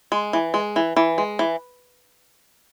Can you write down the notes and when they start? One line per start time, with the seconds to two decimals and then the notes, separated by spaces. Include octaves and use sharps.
0.12 G#3
0.33 E3
0.54 G#3
0.76 E3
0.97 E3
1.18 G#3
1.39 E3